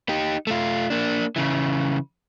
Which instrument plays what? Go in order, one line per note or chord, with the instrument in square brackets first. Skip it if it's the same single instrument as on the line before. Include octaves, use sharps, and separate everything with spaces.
[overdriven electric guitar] D#4 G4
A3 F4
A#3 D4
C#3 E3